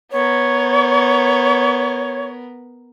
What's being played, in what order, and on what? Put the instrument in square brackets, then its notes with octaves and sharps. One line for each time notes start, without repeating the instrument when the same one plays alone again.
[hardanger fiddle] B3 A#4 [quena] C#5